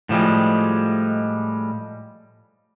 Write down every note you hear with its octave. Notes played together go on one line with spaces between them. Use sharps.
A2 F3 G3 G#3